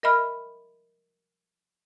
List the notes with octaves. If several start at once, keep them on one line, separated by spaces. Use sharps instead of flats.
A#4 D#5 E5 B5 F6